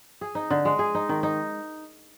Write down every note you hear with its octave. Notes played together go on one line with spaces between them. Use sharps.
G#4
D#4
D3
G#3
G#4
D#4
D#3
D#4